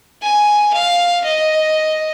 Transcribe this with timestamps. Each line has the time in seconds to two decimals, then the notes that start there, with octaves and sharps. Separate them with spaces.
0.22 G#5
0.74 F5
1.24 D#5